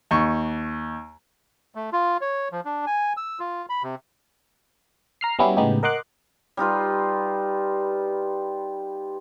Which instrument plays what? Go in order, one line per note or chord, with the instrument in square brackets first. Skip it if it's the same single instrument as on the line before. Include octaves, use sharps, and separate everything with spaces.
[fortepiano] D#2 C#6
[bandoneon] A3
F4
C#5
F3
D4
G#5
E6
F4
B5
C3
[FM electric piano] A#5 F6 C7
G3 B3 C#4 E4 F#4 G4
A2 C#3 G#3 B3 D#4 G4
A#4 D#5 F#5 C6 D6 F#6
[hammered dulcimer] G3 D#4 F4 B4